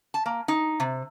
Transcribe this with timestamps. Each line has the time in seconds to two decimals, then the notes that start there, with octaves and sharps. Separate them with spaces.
0.14 A5
0.26 A#3
0.48 D#4
0.80 C3